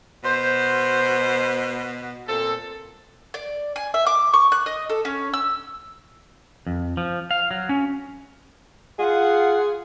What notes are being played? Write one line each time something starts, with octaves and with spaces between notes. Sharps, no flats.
B2 C5
A#2 C4 A4
D5
G#5
E5
D6
C#6
F#6
D#5
A4
C#4
E6
F2
F3
F5
F#3
C#4
F4 G#4 F#5